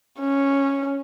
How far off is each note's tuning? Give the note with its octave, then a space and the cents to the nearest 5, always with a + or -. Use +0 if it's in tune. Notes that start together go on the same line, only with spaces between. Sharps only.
C#4 -5